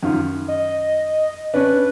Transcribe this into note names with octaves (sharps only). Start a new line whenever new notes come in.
F#2 D#3 F4
D#5
C#4 D4 B4